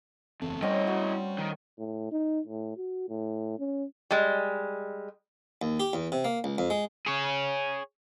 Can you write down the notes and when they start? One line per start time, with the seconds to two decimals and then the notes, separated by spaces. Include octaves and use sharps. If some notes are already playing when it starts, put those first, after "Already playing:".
0.42 F#1 E2 A3 C4
0.62 G3 C4 C#4 E4 D#5 F#5
0.87 F#4
1.38 D#3
1.79 A2
2.12 D#4
2.47 A2
2.77 F#4
3.09 A2
3.59 C#4
4.11 G3 G#3
5.62 D#2
5.80 G4
5.93 E2
6.12 C3
6.25 A#3
6.44 C#2
6.58 F2
6.70 G#3
7.06 G#4 C#5